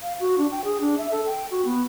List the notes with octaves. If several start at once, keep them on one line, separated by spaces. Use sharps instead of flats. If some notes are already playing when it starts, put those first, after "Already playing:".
F5
F#4
D4
G5
G#4
D4
E5
A4
G5
F#4
B3